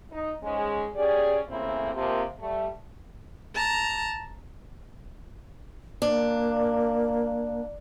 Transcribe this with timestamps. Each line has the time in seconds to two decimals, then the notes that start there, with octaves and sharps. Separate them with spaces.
0.11 D#4
0.43 G#2 G#3 C#4
0.95 C#4 G4 G#4 D5
1.49 A2 C#3 E3 A#3 C4 E4
1.94 C3 F3 A#3
2.40 G3 A3
3.55 A5 A#5
6.02 A#3 D4